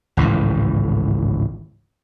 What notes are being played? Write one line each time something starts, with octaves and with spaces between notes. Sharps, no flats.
G#1 C#2 A2 E3